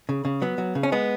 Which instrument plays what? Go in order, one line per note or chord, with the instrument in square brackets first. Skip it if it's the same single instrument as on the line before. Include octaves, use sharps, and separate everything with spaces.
[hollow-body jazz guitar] C#3
C#3
F#3 B3
F#3
C#3
C#4
G#3 B3